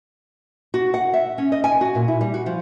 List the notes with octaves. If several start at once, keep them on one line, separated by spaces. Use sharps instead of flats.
F#4
F#5
E5
C#4
D#5
G#5
F#4
A#2
E4
G3
F#4
F3